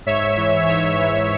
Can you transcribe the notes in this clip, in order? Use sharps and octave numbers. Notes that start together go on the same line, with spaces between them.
G#2 C#5 E5
E3
G#2 C#5 E5
E3